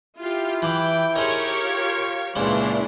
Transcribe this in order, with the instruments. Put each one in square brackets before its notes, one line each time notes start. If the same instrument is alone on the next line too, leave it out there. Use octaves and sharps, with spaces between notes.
[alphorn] E4 [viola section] F4 G4
[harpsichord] E3 D6 [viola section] G5
[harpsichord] D#4 G#4 C5 [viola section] G4 A#4 C#5
[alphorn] F4
[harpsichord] C#2 A#2 C5 [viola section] E3 D4 [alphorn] F3